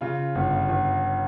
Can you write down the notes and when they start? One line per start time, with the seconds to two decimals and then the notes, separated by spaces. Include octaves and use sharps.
0.01 C#3 F4
0.35 G1
0.69 G1